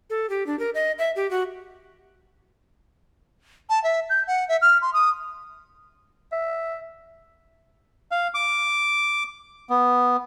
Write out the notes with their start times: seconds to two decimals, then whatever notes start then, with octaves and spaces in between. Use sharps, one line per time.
0.10 A4
0.30 G4
0.47 D4
0.59 A#4
0.75 D#5
0.99 E5
1.16 G4
1.31 F#4
3.70 A5
3.84 E5
4.10 G6
4.27 F#5
4.49 E5
4.62 F6
4.82 C6
4.93 D#6
6.32 E5
8.12 F5
8.34 D6
9.70 B3